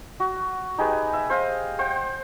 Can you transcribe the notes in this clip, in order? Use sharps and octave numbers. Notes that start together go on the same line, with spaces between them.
F#4
D#4 G4 G#4 B4
E5
C5 D#5 F5
C5 F#5 G5